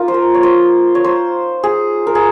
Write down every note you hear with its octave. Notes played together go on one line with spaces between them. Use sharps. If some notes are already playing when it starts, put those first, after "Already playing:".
Already playing: A#3 D#4 F4
C5
A#4
C#5
C5
C#5
C5
G#4
A#4
G#4